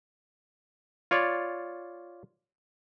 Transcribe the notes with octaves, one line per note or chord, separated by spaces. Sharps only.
F4 C#5 D5